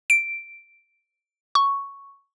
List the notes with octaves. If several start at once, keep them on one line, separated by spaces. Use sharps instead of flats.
D7
C#6